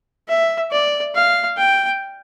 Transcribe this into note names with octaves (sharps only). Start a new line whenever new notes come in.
E5
D5
F5
G5